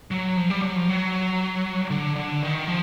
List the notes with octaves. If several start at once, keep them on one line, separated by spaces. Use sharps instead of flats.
F#3
F3
G3
F#3
F3
F#3
D3
D3
D#3
F3